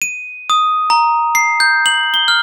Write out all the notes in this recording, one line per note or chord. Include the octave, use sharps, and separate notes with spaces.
D#7
D#6
A#5
C7
G6
F#7
G7
F6